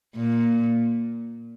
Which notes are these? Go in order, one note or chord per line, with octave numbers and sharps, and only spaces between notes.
A#2